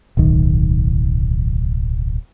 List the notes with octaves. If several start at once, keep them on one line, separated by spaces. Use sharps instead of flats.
D1 B1 D#3